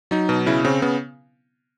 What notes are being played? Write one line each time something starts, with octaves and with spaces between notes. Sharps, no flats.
F#3 D#4
B2
C#3 E4
C#3 C4
C#3 B3